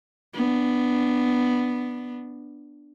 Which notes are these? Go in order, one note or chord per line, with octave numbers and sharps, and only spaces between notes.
B3 D4